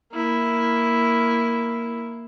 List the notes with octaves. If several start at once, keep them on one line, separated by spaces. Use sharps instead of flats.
A#3 E4